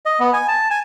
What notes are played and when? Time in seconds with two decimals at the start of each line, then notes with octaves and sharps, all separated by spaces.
0.06 D#5
0.20 B3
0.33 G#5
0.48 A5
0.70 G#5